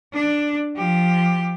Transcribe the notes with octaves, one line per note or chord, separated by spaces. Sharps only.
D4
F3 G4